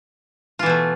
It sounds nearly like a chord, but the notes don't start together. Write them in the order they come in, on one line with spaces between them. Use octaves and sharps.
F4 E3 B2 A3